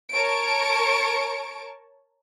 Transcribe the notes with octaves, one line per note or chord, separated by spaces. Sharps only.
A#4 C#5 A5 C#6 D7